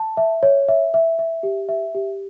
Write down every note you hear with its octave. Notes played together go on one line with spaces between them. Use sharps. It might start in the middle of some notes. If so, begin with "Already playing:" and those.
Already playing: A5
E5
C#5
E5
E5
E5
G4
E5
G4